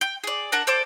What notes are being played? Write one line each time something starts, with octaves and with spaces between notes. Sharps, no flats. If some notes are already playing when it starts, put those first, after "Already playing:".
G5
G#4 D5
D4 A#4 F#5 A5
A4 C5 D5 D6